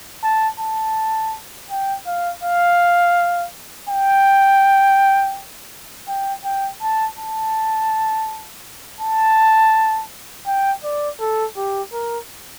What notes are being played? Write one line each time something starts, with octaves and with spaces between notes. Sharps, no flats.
A5
A5
G5
F5
F5
G5
G5
G5
A5
A5
A5
G5
D5
A4
G4
A#4